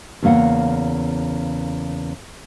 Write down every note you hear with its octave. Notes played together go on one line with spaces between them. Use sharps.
E2 C#3 A#3 F5 F#5